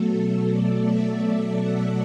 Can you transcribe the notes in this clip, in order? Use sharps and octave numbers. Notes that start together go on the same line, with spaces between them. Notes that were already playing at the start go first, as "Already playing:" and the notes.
Already playing: B2 F#3 A3 A4
A4
D5
E5
F#5